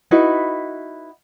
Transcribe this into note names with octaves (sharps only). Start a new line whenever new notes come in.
D#4 E4 F#4 B4